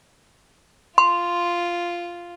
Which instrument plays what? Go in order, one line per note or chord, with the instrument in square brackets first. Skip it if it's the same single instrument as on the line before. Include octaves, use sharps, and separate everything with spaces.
[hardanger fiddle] F4 [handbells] C6